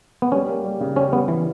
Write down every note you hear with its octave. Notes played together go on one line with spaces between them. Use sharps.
B3
G3 C#4
A#3
G3
C#3
G3 C#4
G3 B3
E3